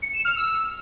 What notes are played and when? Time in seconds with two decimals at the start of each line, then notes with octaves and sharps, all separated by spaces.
0.02 C#7
0.13 E7
0.25 F6
0.36 E6